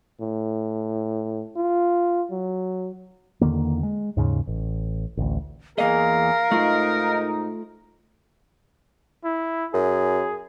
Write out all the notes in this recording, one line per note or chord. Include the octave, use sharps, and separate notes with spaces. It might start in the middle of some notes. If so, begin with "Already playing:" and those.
A2
F4
F#3
E2 D3 D#3 A#3
G#3
D#2 G#2 C#3
A1
A1 D2
E2 A#3 G#4 A#4 D#5 F5
G#2 A3 D#4 F4
E4
F#2 G#4